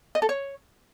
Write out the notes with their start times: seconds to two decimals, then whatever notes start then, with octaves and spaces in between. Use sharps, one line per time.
0.15 D#5
0.22 A4
0.29 C#5